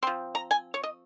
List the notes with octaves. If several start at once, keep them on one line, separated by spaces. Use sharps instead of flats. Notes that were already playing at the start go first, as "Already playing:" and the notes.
F3 C4 C6
A#5
G#5
C#5
D#5